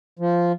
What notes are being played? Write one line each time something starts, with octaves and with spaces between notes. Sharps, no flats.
F3